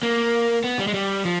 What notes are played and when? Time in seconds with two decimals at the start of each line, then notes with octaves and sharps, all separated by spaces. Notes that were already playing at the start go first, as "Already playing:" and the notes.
0.03 A#3
0.64 B3
0.79 G3
0.87 G#3
0.94 G3
1.25 F3